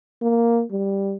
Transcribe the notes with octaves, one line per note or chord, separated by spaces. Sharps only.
A#3
G3